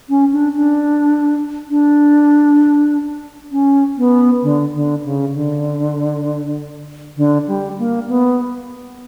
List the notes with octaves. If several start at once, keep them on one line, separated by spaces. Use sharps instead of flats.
C#4
D4
D4
D4
C#4
B3
D3
D3
C#3
D3
D3
G3
A#3
B3